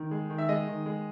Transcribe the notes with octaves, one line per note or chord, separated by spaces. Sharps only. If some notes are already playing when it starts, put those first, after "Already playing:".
Already playing: D#3
G#3
D#3
E5
G#3 D#5
D#3
G#3